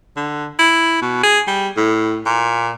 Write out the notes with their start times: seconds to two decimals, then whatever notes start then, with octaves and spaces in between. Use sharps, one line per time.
0.16 D3
0.59 E4
1.02 B2
1.23 G#4
1.47 G3
1.77 A2
2.26 A#2